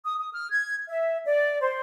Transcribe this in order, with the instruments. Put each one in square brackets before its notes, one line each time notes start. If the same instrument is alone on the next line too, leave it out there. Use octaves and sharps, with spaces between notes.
[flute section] D#6
D#6
F6
G#6
E5
D5
C5